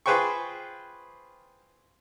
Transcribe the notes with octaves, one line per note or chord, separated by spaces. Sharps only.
F4 G#4 B4 C5 G5 C#6